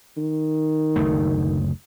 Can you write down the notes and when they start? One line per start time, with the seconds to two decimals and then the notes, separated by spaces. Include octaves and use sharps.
0.17 D#3
0.96 F#1 D2 A3